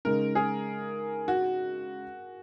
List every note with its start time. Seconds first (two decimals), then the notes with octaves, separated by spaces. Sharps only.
0.05 C#3 G#3 D#4 A#4
0.35 G#4
1.28 F#4